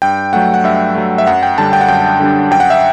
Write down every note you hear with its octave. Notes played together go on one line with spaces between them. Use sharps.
G2 G5
F#3 A3 F#5
F#5
G2 E5
F#3 A3
E5
F#2 F#5
G5
D3 G3 D4 A5
G5
F#5
F#2 G5
D3 G3 D4
F#2 G5
F#5
E5